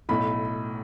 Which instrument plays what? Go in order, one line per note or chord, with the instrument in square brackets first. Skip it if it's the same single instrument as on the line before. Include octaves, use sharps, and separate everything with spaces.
[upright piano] B1 A2 A3 B5